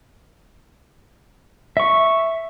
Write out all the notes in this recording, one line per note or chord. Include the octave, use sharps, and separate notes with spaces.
E5 C#6